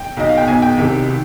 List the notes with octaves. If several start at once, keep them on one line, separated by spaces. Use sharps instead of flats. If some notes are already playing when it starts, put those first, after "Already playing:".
Already playing: G5
B1 B2 D#5
F5
G5
B1 B2 G#5
G5
C2 C3 D#3
D#3